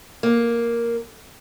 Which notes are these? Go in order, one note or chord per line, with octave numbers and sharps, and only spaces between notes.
A#3